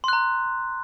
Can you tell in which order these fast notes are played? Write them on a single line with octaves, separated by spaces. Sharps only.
C6 F#6 A#5